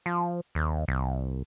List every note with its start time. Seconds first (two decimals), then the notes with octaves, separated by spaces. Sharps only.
0.06 F3
0.55 D#2
0.88 C2